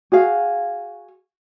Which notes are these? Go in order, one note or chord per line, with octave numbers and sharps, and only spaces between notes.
F#4 G#4 F5